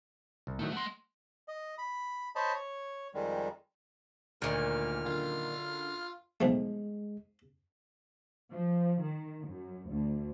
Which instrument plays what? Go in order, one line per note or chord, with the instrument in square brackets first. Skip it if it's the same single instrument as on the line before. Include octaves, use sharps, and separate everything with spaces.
[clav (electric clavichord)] C2
[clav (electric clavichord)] A2 D#3 F#3 [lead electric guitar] A3
[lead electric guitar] A3 C6 [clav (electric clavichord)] F#5
[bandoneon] D#5
B5
C5 C#5 D#5 A5 B5
C#5
F2 D#3 G3 G#3
[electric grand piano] D2 [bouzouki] A#2 D#3 [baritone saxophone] A#3 [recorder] F6
[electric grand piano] F#2 D3 [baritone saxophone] F4
[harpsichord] B1 F3 A3 [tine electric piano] G#3
[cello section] F3
D#3
F#2
D2